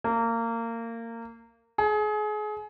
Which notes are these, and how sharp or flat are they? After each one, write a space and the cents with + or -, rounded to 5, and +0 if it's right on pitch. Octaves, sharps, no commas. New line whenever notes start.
A#3 -25
G#4 +30